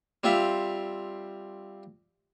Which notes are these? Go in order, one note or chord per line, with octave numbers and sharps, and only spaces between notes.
G3 C4 F4 G4 E5 F5